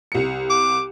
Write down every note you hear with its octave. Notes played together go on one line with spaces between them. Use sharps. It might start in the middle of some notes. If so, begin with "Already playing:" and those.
C2 C#7
D6